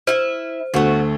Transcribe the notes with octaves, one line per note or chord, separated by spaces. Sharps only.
E4 C5 E5
D2 A3 B3 F#4